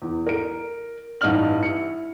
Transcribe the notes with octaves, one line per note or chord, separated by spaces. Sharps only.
E2
A#4 D7
A1 G2 D#4 D5 F6 F#7
E4 C#7